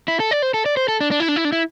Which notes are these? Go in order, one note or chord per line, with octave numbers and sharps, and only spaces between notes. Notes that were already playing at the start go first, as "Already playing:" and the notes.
E4
A4
D5
C5
A4
D5
C5
A4
D4
D4
E4
D4
E4
D4
E4